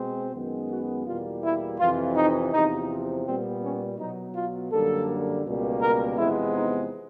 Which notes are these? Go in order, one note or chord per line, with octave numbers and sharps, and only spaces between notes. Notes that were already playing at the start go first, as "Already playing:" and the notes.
Already playing: B2 G#3 C4
F#2 D#3 G#3 B3
F#4
E2 B2 G3 A#3 F4
E4
F2 C3 E3 F4
D#4
E2 C3 F3 D#4
A#2 G3 B3 C4
C#4
B2 F#3 B3 D#4
F4
F#2 D3 G3 A#3 A4
C#2 B2 G3 A#3
A#4
E2 C3 F3 G#3 B3 E4
D#4